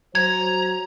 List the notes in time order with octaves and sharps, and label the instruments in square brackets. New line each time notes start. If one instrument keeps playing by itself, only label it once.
[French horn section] F#3 C5 [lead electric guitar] A#5 [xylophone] G#6